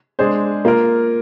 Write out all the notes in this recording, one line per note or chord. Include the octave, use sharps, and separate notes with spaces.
G#3 D4 G#4 C5
A#3 F4 A#4